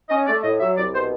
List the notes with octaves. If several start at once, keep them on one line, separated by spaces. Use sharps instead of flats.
C#4 D#5
A3 D5
A2 D#5
F#3 E5
C2 D5
B2 C5